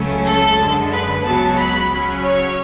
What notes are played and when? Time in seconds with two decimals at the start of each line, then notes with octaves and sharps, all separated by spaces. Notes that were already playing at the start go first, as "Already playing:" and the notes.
Already playing: C#2 C#3 F#3 A3 C#4
0.25 A4
0.59 F#2 D3 G#3
0.92 B4
1.24 C#2 C#3 F#3 B3 A5
1.59 B5
1.91 C#3 F#3 C#4
2.24 C#5